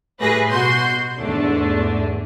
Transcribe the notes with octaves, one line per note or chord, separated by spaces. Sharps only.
A2 G3 A3 G#4 B4 A#6
B2 F#4 C6 G6
E2 G#2 D3 A3 D4